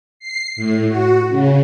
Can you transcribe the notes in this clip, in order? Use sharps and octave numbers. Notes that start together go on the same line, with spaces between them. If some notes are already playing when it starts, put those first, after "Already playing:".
C7
A2
F#4
C#3